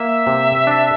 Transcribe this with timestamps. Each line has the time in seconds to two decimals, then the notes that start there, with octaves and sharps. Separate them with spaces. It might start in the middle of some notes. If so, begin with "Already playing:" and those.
Already playing: A#3 E5
0.27 C3
0.67 D4